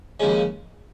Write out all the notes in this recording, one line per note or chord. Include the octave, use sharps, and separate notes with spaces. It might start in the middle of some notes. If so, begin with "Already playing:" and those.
D#2 C#3 F3 G#3 C#4